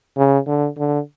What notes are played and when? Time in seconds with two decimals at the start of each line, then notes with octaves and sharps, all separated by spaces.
0.17 C#3
0.47 D3
0.78 D3